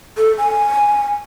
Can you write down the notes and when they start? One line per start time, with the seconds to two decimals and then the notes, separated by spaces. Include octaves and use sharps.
0.18 A4
0.38 G#5